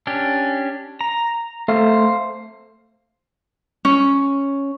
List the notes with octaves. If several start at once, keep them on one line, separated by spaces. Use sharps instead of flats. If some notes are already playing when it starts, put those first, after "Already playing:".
C#4 D4 G4
A#5
A3 C5 F5
C#4